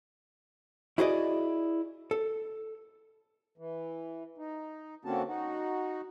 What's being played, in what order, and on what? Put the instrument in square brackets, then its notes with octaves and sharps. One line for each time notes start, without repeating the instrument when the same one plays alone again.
[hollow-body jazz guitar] E4 F#4 G#4 C5 D5 D#5
A4
[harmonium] E3
D#4
D3 A#3 C4 C#4 F#4 A5
D#4 F#4